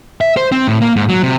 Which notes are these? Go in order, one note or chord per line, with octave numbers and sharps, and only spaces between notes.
E5
C5
C4
A2
A#3
G#2
F#3
C3